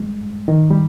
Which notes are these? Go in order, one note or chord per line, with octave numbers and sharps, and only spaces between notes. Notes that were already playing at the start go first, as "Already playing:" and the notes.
Already playing: G3 G#3
D#3
G3